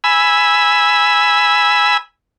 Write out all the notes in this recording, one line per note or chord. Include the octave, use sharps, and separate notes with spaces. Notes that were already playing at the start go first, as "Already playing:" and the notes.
G#5 B5 E6